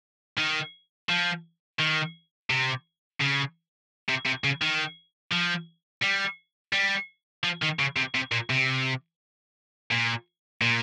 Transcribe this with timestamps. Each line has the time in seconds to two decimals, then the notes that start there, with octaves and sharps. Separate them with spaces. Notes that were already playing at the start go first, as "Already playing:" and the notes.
0.38 D#3
1.09 F3
1.80 D#3
2.50 C3
3.21 C#3
4.09 C3
4.26 C3
4.44 C#3
4.62 D#3
5.32 F3
6.03 G3
6.73 G3
7.44 F3
7.62 D#3
7.79 C#3
7.96 C3
8.15 C3
8.32 A#2
8.50 C3
9.91 A#2
10.61 A#2